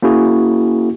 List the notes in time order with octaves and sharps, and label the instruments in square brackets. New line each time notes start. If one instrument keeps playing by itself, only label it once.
[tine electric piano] A#3 C#4 E4 F#4 G#4